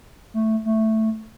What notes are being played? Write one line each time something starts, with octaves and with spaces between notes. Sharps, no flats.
A3
A3